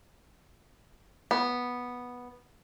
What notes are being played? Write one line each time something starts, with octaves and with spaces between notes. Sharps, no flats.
B3